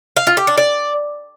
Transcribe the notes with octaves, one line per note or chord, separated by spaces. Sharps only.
F5
F4
G4
D4
D5